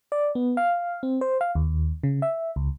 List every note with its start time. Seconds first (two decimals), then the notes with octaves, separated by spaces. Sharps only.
0.12 D5
0.35 B3
0.57 F5
1.03 C4
1.21 C5
1.41 F5
1.55 D#2
2.03 C#3
2.22 E5
2.56 C#2